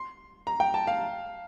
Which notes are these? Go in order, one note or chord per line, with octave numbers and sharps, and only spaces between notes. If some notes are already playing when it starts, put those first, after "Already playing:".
Already playing: C6
A#5
G5
A5
F5